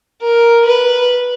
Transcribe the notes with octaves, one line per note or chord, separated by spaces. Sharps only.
A#4
B4